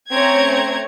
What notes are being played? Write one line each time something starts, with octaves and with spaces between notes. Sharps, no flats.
A3 C4 C#4 C#5 A#5 G#6